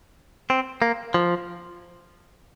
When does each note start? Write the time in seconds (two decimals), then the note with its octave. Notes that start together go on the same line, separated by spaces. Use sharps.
0.50 C4
0.82 A#3
1.14 F3